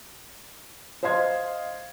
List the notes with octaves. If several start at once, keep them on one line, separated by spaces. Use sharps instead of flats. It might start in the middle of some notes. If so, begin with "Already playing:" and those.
C5 D#5 F5 C6 G#6